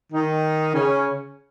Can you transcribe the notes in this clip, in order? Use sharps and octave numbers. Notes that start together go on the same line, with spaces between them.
D#3 D#4
C#3 C#4